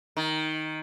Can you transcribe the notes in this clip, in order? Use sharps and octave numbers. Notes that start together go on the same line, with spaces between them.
D#3